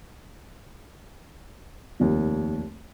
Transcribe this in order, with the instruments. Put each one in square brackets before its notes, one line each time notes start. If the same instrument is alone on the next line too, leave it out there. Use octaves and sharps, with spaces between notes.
[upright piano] F1 D#2